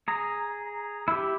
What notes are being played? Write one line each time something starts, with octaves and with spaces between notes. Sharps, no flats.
G#4 A#5
E4 G4